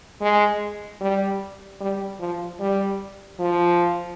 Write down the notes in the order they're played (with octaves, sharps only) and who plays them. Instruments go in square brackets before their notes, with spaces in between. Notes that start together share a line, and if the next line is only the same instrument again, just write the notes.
[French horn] G#3
G3
G3
F3
G3
F3